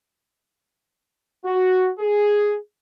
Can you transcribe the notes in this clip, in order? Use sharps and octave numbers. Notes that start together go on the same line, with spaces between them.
F#4
G#4